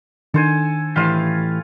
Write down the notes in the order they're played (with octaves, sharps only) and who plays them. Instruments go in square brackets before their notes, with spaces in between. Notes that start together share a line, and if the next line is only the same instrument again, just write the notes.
[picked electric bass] D#3 D4 [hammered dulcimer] A4 C5 G#5
[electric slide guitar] A2 E3 G4 [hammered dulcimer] F4 F5